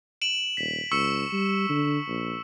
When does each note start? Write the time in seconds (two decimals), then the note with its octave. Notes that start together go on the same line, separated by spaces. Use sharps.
0.22 D7 E7 F#7
0.57 D#1 B6
0.91 C#2 C#6 E6 C#7
1.32 G3
1.69 D3
2.08 A#1